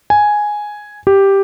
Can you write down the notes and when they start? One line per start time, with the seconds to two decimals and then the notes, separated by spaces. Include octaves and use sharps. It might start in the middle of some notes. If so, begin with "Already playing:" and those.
0.10 G#5
1.07 G4